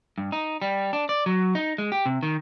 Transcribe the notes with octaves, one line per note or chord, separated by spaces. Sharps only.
G2
D#4
G3
D4
D5
F#3
D#4
G#3
G4
C3
D#3